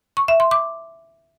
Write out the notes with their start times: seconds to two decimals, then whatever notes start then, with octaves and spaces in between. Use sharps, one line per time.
0.17 C#6
0.28 E5
0.40 C6
0.51 D6